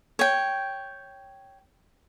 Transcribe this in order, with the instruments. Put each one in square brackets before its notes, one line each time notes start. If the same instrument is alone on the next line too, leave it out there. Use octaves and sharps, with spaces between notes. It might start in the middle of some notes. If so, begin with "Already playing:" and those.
[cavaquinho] C#5 G5